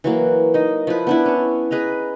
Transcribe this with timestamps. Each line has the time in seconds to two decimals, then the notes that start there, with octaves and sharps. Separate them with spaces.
0.04 E3 F#3 A#3
0.54 D#4 D#5
0.87 F3 E4 B4
1.07 B3 D4 E4
1.26 C#4 A5
1.71 G#4 B4 D#5 A#5